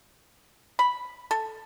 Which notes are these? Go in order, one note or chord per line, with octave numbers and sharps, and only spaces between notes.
B5
A4